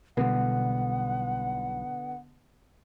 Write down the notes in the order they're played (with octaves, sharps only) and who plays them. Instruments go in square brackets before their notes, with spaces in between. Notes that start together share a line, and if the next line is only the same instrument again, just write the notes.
[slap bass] B1 E3 G3 [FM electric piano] B2 [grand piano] D3 B3 [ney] F#5